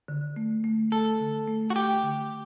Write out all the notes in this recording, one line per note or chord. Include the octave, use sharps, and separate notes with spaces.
D3
A3
A3
A3 A4
D3
A3
F#4
A3 G4
D3